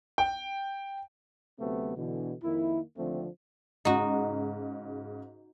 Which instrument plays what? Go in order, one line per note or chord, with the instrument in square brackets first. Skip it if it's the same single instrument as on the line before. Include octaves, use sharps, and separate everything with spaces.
[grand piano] G5
[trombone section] D2 C3 F#3 A3 B3 C4
B2 D3 E3
F2 D#3 A#3 E4
D#2 D3 F3 A3 C4
[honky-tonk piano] G#2 C#3 [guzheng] D#4 F#4